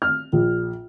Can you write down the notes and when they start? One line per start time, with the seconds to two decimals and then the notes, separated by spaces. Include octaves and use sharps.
0.02 F6
0.33 A#1